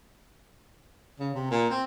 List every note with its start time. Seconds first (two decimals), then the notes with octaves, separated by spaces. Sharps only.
1.20 C#3
1.34 C3
1.51 A#2
1.70 C4